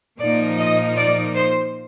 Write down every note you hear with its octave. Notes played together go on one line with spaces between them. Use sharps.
A#2 F3 A#3 D#4 D5
D#5
D5
C5